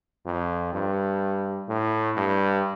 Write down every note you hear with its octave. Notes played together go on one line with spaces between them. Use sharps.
F2
G2
A2
G2